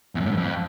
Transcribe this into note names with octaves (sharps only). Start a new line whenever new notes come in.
E2
F#2
A2
G2
F2